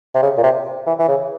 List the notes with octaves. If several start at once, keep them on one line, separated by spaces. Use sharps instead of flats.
C3
C#3
A#2
C3
E3
E3
C#3